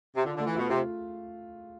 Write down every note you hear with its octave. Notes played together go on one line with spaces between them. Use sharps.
C3
D3 F4
D3
A3
E3
B2 F4
C3 F4